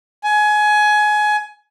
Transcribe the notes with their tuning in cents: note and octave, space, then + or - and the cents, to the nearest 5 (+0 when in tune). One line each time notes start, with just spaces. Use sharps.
G#5 +20